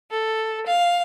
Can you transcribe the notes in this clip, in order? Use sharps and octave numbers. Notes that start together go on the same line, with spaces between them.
A4
F5